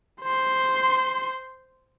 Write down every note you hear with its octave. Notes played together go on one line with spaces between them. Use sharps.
C5 C6